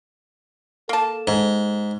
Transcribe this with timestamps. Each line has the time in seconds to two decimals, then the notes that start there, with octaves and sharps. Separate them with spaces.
0.89 A#3 A4 A5
1.27 G#2